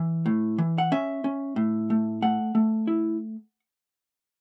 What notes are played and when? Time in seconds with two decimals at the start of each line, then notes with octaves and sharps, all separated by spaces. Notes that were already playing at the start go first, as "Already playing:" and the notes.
Already playing: E3
0.26 A2
0.58 E3
0.78 F#5
0.92 C#4 E5
1.24 C#4
1.56 A2
1.90 A3
2.22 A3 F#5
2.55 A3
2.87 E4